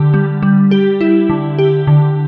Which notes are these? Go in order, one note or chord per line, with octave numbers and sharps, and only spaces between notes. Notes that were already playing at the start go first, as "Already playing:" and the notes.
Already playing: D3 G4
G3
G3
G4
E4
D3
G4
D3